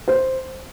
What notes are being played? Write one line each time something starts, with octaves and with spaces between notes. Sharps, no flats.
C5